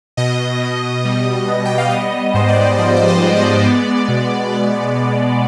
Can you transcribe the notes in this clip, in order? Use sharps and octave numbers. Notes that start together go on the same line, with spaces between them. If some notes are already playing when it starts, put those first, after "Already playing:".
B2 D#5
B2
G3
B3
G5
F5
B3 D#5
G#2 C5
D5
C5
F3 D5
D5
D#5
G#3
D5
B3
B2
B3
B2